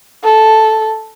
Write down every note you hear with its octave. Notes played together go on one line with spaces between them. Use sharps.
A4